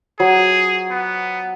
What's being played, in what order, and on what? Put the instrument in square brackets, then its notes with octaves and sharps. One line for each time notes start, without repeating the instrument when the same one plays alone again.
[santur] F#3 [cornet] G#4
[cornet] B3